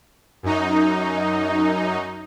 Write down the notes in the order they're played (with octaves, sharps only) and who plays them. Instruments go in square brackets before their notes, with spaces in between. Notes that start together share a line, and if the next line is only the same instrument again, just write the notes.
[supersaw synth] F#2 D#4